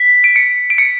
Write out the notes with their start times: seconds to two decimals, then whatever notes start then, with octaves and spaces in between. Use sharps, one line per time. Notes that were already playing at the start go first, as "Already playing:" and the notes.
Already playing: B6
0.24 D7
0.36 C#7
0.70 D7
0.78 C#7